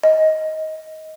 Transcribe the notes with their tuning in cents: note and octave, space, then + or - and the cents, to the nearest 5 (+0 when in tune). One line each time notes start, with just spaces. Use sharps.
D#5 +15